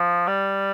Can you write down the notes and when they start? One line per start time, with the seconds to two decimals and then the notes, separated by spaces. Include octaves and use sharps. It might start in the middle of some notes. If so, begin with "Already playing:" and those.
Already playing: F3
0.27 G3